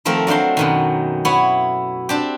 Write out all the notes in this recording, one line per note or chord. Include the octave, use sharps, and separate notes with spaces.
D#3 F3 A3 C4 A#4
F#3 D4 F4 C5 C6
F#2 B2 D#3
B3 E4 C#5
C4 D4 G4